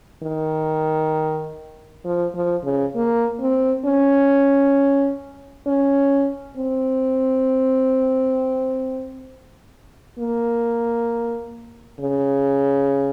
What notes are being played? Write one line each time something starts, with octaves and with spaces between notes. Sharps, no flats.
D#3
F3
F3
C#3
A#3
C4
C#4
C#4
C4
A#3
C#3